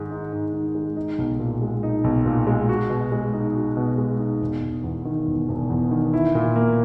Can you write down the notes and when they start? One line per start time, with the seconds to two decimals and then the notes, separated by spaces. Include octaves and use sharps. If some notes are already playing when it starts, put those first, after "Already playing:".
Already playing: G#2 D#3 G#3
0.11 D#4
0.32 G#2
0.53 D#3
0.75 G#3
0.97 D#4
1.18 B1
1.39 A#2
1.62 G#3
1.83 D#4
2.04 B1
2.26 A#2
2.47 G#3
2.69 F#4
2.90 B2
3.12 G#3
3.33 D#4
3.55 F#4
3.77 B2
3.98 G#3
4.19 D#4
4.41 E1
4.62 E1
4.84 E2
5.05 D#3
5.27 E1
5.49 E1
5.70 E2
5.91 D#3
6.14 E4
6.35 A#2
6.56 A#3